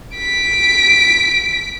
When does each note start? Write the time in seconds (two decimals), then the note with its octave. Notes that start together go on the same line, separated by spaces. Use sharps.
0.16 B6 D7